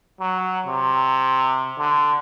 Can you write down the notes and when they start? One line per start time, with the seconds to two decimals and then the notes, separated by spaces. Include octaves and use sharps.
0.20 F#3
0.67 C3
1.78 D3